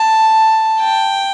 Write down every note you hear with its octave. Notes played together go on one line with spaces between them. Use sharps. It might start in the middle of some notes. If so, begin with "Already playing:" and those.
Already playing: A5
G5